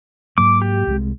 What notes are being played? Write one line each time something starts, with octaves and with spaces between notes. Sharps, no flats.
G#2 F#3 A#3 D6
G4
C2 C3 G#3